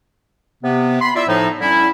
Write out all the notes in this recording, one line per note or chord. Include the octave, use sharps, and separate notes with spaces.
C3 B3
B5 C6
E4 F4 D5 E5
A2 F3 D#4
D3 G3 C#4 E4